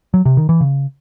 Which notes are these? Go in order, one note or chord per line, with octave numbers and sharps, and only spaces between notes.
F#3
C3
D#3
E3
C#3